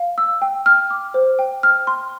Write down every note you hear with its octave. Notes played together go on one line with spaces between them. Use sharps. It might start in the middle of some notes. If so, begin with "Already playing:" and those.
Already playing: F5
E6
G5
F6
D6
C5
G5
F6
C6